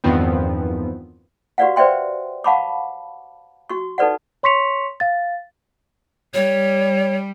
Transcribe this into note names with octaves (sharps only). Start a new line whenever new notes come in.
E2 G2 D#3 F3 B3 C4
F#4 G4 B4 D5 F5 F#5
B4 C5 D5 E5 G5 C6
F5 F#5 A5 B5 C#6 D6
F#4 C#6
D#4 A4 B4 D5 F#5
C#5 C6 C#6 B6 C#7 F7
F5 A6
G3 C#5